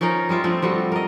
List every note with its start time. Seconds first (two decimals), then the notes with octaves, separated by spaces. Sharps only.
0.01 F3 C#4 D#4 A#4
0.29 G3 G#3 F4 E5
0.44 F3 A3 C4 D4
0.62 F3 G3 F#4 A4
0.92 A#4 D#5